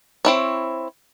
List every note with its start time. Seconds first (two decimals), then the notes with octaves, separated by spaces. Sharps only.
0.25 C4 E4 C#5